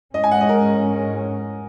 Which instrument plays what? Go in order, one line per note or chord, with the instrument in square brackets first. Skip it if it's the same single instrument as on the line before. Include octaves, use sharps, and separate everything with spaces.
[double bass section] G#2 G#3 C#4 [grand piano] D#5
[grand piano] G#5
F#5
D#5
A#4